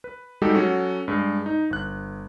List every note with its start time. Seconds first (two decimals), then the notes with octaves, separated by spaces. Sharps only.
0.04 B4
0.42 G3 G#3 D#4 F#4 G4 A4
0.54 F#3 C#4 F#4 A4
1.08 G2 G#3
1.46 D#4
1.70 G1 F#6